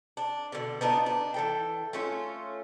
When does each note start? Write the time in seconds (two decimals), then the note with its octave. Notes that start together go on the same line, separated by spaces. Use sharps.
0.17 D4
0.52 B2 D3
0.81 B3 D4 D#4 F4
1.06 D4
1.34 E3 A4 G5
1.93 A3 C#4 F4